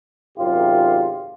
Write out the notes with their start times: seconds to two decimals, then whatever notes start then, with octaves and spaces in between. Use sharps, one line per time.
0.38 G#1 F#2 C3 F4 G4